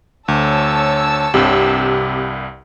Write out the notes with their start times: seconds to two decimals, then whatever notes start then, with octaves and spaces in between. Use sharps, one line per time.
0.28 D2 C#5 A5 E6
1.34 C2 G2 C3